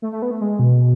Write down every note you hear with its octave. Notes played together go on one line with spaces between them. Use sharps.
A3
A3
B3
A3
G#3
B2